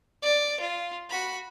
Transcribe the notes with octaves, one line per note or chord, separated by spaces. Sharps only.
D5
F4
F#4 B5